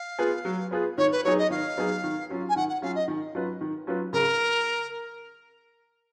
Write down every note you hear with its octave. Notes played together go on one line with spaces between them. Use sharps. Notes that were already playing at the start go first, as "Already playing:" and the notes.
Already playing: F5
B3 F4 G#4 B4
F#3
B3 F4 G#4 B4
D#3 C#5
B4
F#3 B3 D#4 G#4 C#5
D#5
D#3 F5
F#3 B3 D#4 G#4
D#3
F#3 C#4 F4
G#5
D#3 F#5
F#5
F#3 C#4 F4 F5
D#5
D#3
F#3 C#4 F4 B4
D#3
F#3 C#4 F4 B4
C#3 A#4